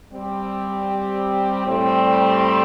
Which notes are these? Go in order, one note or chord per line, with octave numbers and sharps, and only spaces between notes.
G3 C4 G4
A2 G3 C4